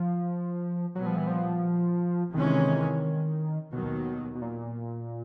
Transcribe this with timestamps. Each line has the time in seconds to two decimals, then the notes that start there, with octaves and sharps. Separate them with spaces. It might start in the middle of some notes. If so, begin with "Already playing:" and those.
Already playing: F3
0.95 A#2 F#3 G3 B3
1.06 F3
1.17 E3
1.27 F3
2.34 C3 D#3 E3 G#3 C#4
3.72 D#2 B2 D#3 F#3
4.35 B2
4.42 A#2